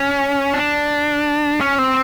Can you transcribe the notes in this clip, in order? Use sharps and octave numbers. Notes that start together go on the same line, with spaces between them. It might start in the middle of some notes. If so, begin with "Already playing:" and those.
Already playing: C#4
D4
C#4
C4